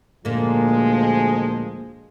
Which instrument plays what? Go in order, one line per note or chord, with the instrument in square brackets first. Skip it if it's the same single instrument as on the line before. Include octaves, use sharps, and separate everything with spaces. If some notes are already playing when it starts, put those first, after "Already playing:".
[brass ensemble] D2 F3 G#3 [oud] A#2 A#3